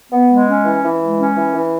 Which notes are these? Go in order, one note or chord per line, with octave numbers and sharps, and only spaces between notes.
B3
G#3
C#4
E3
E3
G#3
C#4
E3
E3